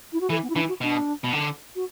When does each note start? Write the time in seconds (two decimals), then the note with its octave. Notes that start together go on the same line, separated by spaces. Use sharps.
0.13 E4
0.21 F#4
0.30 E3 A4
0.42 B3
0.50 E4
0.55 E3 D4
0.68 F#4
0.81 B2 D4
1.24 B2
1.33 D3
1.75 F#4